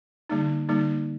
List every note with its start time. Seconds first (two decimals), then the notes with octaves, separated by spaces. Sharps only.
0.29 D3 G3 A#3 D#4
0.69 D3 G3 A#3 D#4